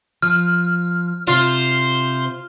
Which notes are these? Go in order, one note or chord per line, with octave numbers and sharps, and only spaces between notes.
F3 F6
C3 F4 C5